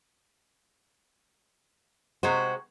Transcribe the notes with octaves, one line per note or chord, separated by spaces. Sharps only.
C3 G#3 F#4 C5